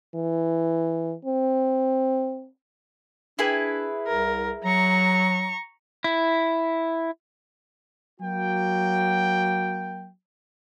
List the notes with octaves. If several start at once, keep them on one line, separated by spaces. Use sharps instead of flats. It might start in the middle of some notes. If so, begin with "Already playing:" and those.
E3
C4
D4 E4 G#4 B4
C2 A#4
F#3 A#5 C#6
E4
F#3 A#3 F#4 G5